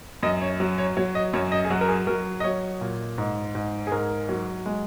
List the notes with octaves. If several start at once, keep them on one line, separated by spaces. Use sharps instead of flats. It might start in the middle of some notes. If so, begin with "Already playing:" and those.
F#2 D#5
C#5
F#3
C#5
F#3 C#5
D#5
F#2 C#5
D#5
G#4
F#3 F#4
A#4
G#4
F#3 A#4
D#5
F#3 C#5
A#2
G#2
G#2
G#4
G#2 A#4
F#3
G#3